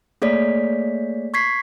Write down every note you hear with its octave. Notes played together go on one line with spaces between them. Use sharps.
A3 A#3 G#4 C#5 D5 B6
C#6 G#6 B6 C7